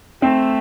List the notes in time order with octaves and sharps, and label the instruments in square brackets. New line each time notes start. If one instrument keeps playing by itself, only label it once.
[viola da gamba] A3 [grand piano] C4